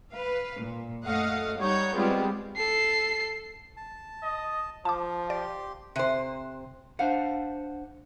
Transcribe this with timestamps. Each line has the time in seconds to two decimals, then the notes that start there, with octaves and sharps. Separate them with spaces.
0.12 B4 F5
0.58 A#2
1.04 F#2 A3 D#5 F5 F#5
1.57 G3 D#4 C#5 F#5 G6
1.95 G3 G#3 B3 C4 F4 G4
2.57 A4 C7
3.77 A5
4.23 D#5
4.85 F3 F4 A5 D6
5.30 G4 D5 C6
5.96 C3 C5
6.99 D4 C5 F5 F#5